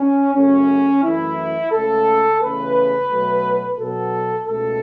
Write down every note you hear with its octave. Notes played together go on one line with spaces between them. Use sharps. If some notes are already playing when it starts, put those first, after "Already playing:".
Already playing: C#4
F#2 C#3 A3 C#4
F#2 E3 A3 E4
C#2 C#3 A3 A4
E2 C#3 A3 B4
B2 F#3 A3
B2 F#3 B3 A4
C#2 B2 A3 A4